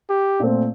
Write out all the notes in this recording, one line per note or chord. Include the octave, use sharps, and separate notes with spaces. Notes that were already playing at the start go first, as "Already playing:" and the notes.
G4
A#2 A3 C4